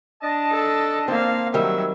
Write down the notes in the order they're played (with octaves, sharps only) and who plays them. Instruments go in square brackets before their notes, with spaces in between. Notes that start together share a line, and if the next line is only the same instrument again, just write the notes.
[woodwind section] D4 D#5 A5
[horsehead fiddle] A4
[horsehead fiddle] A#3 F5 [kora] C4
[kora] D#3 G3 [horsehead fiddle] F#3 E5